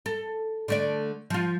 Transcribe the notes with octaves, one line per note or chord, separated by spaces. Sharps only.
A4
D3 A3 D5
F3 F4